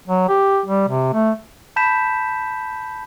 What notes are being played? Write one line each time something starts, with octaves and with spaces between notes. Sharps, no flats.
F#3
G4
G3
C3
A3
A5 B5 G6 B6 E7